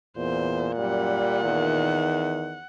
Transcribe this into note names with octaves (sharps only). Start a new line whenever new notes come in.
E2 A#2 C5
F#2 G3 F#5
E2 D#3